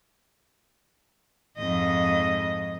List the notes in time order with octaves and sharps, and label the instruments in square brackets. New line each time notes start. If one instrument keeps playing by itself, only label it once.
[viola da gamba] F2 G#2 D#5